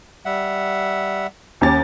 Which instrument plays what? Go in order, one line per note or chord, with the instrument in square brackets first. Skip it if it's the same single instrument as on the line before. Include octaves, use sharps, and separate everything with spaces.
[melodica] G3 E5 F#5
[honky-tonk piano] D#2 C#4 A6 [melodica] G4